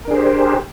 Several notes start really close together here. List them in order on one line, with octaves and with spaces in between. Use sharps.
A#4 D4 G#4 C5 G4